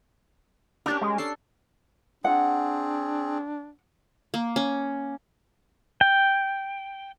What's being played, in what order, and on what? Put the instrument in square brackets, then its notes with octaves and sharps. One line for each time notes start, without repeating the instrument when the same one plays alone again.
[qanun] C#4 G4 A#4 [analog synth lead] D4
[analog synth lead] G#3
[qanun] D4 A4 [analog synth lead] C7
[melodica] C4 G#4 [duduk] D4 [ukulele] F#5
[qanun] A#3
C#4
[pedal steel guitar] G5